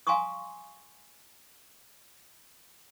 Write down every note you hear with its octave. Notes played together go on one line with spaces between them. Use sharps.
F5 G#5 A#5 C6 C#6 D#6